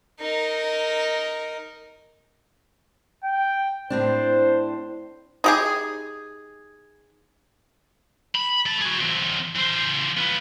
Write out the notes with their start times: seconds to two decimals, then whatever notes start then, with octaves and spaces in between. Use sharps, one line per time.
0.20 D#4 A#4
3.24 G5
3.90 A2 C4 D4 C5
5.44 D#4 G4 G#4
8.35 B5
8.66 A3 A5
8.81 F#4 G#4
9.01 E3 C4
9.55 E3 C5
10.17 F4 B4